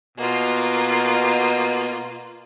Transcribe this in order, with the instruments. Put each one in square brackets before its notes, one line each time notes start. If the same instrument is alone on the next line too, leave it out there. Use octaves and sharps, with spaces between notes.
[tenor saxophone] B2 [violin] A#3 F4